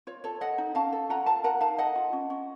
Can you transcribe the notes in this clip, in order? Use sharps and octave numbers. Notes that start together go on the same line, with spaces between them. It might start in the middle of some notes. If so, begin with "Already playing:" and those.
F4 C#5
A4 C#5
A4 D#5 F#5
D#4
C#4 F5 A5
A4
F4 F#5 A#5
A4 F5 A5
A#4 F#5 A#5
D#4 F5 A5
A4 D#5 F#5
F4
C#4
C#4